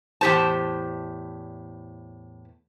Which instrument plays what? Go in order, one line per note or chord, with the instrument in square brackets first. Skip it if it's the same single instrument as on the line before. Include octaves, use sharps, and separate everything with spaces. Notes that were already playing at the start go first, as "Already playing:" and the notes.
[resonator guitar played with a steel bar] E2 A2 G4 C5 A5